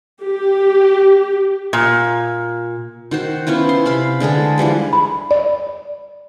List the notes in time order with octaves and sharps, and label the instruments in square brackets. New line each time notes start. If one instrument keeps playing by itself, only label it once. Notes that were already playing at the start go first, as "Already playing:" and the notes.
[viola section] G4
[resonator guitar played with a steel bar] A#2
[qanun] D#3 F#4 C5
B3 C#4 E4 F4
C6
C3 F5 B5
D3 G#3 G#4 A4
E3 F3 G3 B4
[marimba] B5
D5